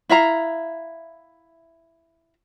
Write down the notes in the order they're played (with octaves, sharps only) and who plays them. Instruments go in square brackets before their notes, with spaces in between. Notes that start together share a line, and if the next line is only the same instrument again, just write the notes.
[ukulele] E4 E5 F5 A#5